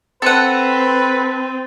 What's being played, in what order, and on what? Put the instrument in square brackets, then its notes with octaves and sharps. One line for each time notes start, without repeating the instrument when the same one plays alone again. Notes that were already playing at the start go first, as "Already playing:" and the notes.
[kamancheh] C4 [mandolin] A4 F#5 [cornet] B4 [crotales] A6 D#7